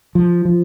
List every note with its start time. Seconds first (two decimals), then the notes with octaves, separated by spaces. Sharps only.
0.15 F3
0.45 F3